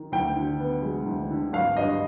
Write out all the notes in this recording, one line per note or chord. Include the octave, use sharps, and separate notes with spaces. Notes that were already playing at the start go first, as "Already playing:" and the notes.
Already playing: D#3
D2 G5
D3
B3
G#3
D2
D3
G#1 F5
G2 D#5